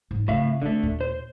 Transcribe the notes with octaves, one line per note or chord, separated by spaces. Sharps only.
G#2 F#3
A2 C#3 C4 E5 F5
D3 A3 C4
D#2 A#2
C5